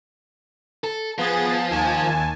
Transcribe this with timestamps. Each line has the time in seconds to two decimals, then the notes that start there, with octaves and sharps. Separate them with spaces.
0.84 A4
1.18 F3 B3 G#4 A6
1.70 D#2 G#5 A5